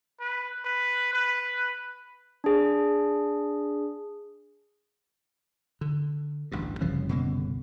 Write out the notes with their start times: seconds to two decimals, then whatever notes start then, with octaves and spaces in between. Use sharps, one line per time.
0.20 B4
0.65 B4
1.14 B4
2.44 D4 G#4
5.81 D3
6.52 A1 D2 G2
6.81 F#1 C2 C#3 E3 F3
7.09 B2 D3 A#3